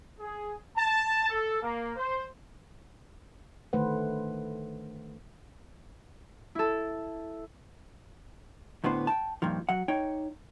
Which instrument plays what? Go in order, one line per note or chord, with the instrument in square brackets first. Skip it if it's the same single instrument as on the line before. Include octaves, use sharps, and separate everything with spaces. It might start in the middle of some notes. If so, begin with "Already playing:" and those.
[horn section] G#4
A5
A4
A#3
C5
[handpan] D3 D#3 A3 B4 C5 F#5
[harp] E4 A4
[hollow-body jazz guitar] D2 A2 B3 D4 C5
G5 A5
G2 A#2 D#3 F3
F#3 F#5
D#4 C#5 G5